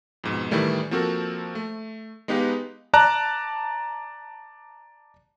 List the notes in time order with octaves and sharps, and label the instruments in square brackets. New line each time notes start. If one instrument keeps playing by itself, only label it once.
[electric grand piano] F2 G#2 B2
A2 D#3 E3 G3 A3
F3 A#3 C4 F#4 A4 A#4
A3
G#3 B3 D#4 G4 B4 F5
D5 A5 A#5 F#6